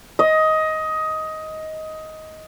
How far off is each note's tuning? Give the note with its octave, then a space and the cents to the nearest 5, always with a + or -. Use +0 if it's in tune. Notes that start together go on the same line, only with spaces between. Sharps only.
D#5 +15